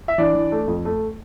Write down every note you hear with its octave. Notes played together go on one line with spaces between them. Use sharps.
E5
E3 D4 D5
E3
A3
F2
A3